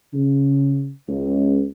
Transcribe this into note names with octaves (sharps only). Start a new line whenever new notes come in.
C#3
C#2